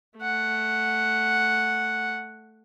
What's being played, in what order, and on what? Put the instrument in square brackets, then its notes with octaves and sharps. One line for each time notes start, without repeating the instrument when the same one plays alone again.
[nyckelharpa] A3 F#5